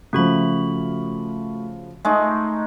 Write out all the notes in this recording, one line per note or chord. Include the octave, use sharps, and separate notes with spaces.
C#3 F3 A3 F#4 B5
G#3 A3 D#4